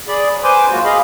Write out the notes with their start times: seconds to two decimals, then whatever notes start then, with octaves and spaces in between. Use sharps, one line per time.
0.08 G#4 D5 B5
0.31 F#3
0.44 B4 C5 G#5 C6 D6
0.70 F#3 G#3 A#3 F4 F#4
0.84 G#4 D#5 F5 B5